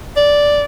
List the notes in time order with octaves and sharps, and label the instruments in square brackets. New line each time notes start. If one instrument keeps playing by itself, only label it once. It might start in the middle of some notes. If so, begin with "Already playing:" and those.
[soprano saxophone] D5